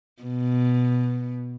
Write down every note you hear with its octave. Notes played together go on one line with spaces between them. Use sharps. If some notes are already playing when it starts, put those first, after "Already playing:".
B2